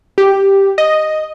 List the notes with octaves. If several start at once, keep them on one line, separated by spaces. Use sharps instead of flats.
G4
D#5